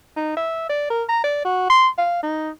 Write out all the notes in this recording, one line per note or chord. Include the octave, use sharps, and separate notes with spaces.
D#4
E5
D5
A#4
A#5
D5
F#4
C6
F5
D#4